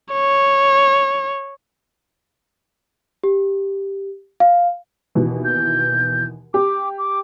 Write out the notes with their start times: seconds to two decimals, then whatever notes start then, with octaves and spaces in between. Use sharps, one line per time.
0.13 C#5
3.24 G4
4.40 F5
5.15 D#2 B2 E3
5.45 G6
6.54 G4 D6
6.98 D6